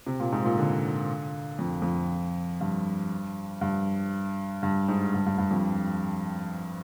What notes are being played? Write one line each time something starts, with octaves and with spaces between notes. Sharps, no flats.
C3
A#2
G#2
A#2
D3
F2
F2
G2
G2
G2
G#2
G2
G2
G2
F2